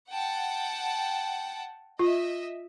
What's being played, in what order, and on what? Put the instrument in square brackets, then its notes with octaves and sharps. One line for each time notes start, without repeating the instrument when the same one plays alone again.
[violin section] F#5 G5 A5
[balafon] F4 [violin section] D#5 E5